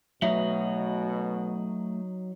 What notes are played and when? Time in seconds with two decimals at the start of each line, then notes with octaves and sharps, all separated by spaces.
0.22 B2 F#3 A3 D#4 E5